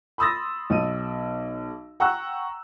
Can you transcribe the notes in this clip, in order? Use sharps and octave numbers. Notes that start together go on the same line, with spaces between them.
B5 C6 D#6 E6 A6 A#6
B1 D#7
F#5 G5 A#5 C#6 E6 F#6